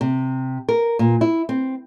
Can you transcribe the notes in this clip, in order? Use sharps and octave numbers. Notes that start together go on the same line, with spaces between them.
C3
A#4
A#2
E4
C4